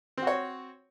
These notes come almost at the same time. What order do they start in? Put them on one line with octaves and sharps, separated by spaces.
C4 F#4 C#5